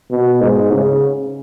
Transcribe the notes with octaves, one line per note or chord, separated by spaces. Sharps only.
B2
G#2
C#3